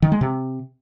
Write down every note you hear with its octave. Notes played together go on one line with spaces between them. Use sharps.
D#3
G#3
C3